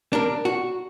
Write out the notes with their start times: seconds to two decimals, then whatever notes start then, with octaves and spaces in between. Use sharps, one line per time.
0.13 D4 A#4
0.45 F#4